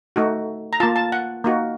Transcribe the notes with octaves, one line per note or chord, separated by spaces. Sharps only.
A3 D#4 F#4
A#5
A#3 F4 A5
A5
F#5
A#3 D#4 F#4